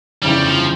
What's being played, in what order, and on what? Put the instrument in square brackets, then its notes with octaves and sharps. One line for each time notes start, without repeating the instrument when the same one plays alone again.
[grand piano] G1 F2 C#3 E3 [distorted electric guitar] G3
[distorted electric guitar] F3